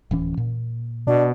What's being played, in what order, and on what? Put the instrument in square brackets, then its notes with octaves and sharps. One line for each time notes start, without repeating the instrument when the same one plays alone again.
[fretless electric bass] D1 E3 C#4
A#2
[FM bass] B2 [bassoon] D4